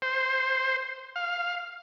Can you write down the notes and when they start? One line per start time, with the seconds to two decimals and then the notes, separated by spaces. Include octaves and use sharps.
0.02 C5
1.16 F5